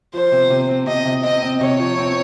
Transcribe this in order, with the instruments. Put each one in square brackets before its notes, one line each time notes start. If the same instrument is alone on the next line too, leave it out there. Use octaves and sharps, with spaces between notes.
[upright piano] F3 [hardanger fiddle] C5
[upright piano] C3
C3
C4
[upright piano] C3 [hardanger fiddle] D#5
[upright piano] C3
[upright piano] C4 [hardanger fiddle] D#5
[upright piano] C4
[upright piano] C3 [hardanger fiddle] C#5
[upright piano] F3
C4